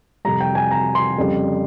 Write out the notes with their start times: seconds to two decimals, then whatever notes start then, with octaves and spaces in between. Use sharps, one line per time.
0.25 F2 C3 G3 A#5
0.41 G5
0.55 G#5
0.71 A#5
0.95 C6
1.18 F2 C#3 G3